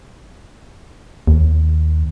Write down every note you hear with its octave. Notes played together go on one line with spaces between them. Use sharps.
D#2